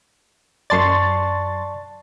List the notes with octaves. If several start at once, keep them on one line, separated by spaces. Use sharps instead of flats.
F#2 D5 A5 C6 C#6 A6